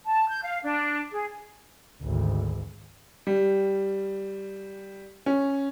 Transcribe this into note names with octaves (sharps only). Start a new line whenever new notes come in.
A5
G6
F5
D4
G#4
G#1 D2
G3
C#4